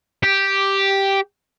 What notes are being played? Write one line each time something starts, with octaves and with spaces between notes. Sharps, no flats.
G4